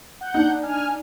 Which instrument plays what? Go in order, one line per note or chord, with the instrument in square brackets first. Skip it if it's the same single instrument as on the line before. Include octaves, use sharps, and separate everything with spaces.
[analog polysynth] F#5 G6
[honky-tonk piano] D4 D#4
[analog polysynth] G#5 F6